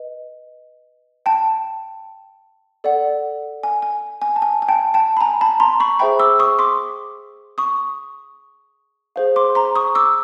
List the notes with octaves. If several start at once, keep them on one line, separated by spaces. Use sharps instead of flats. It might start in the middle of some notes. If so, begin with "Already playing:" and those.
Already playing: B4 D#5
G5 A5
A4 D5 F#5
G#5
G#5
G#5
A5
G#5
G#5
G5 A5
G5 A5
B5
G#5 A#5
A5 B5
A#5 C6
B5 C#6
G#4 C5 E5 G5 B5 C#6
D6 E6
C#6 D#6
C6 D6
C#6 D#6
G#4 C5 F5
C6 D6
A#5 C6
C#6 D#6
D6 E6